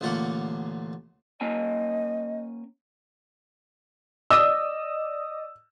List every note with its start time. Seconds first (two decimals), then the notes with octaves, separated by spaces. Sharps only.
0.01 A1 A#2 D3 A#3 F#5
1.41 A#3 C#4 D#5 G#5
4.30 D5 D#5 D#6 E6